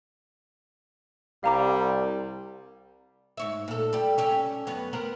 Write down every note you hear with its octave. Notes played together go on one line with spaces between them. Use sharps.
C2 G3 F5 A#5 D6
G#2 C#5 E5
A#2 A4
G3 G4
C#4 G4 A4
F#2 B3 C#5
B3 C4 A#4